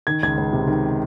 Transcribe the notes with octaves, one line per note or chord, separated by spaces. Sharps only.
D#3 G#6
C#2 G#6
C#2
C3
D#3